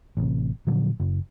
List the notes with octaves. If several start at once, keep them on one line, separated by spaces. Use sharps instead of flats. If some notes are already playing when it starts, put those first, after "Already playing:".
A1 C3
A#2 D3 F3 F#3
F#1